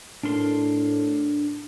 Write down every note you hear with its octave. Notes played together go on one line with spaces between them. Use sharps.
A2 D4 A#4 C6